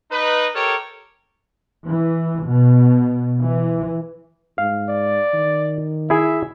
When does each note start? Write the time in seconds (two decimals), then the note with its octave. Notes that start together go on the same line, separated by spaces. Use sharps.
0.11 D#4 B4
0.55 G4 A4 A#4 C#5
1.86 E3
2.47 B2
3.41 E3
4.58 G#2 F5
4.89 D5
5.34 D#3
6.10 E4 G#4 E5